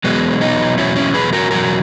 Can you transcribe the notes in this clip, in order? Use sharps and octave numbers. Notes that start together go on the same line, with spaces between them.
E2 B2 F#3 G#3 B3
B3 D#4
E2 B2 F#3 C#4 E4
C#4 E4
G#4 B4
F#4 A#4
E2 B2 F#3 F#4 A#4